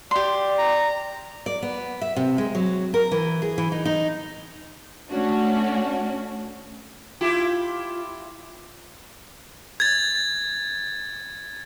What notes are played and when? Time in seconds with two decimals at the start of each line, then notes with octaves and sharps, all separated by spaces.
0.11 G4 D5 C6
0.59 A#5
1.46 D5
1.62 B3
2.01 E5
2.16 C3
2.38 G#3
2.55 F#3
2.94 A#4
3.11 E3
3.42 G#4
3.58 E3
3.72 D#4
3.85 D#4
5.10 A3 C#4 D4 F#4
7.21 E4 F4 G4
9.80 G#6 A6